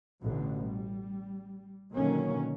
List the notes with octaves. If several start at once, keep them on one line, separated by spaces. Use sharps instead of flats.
A1 B2 D3
G3
B2 D3 D#3 F#3 A#3 C#4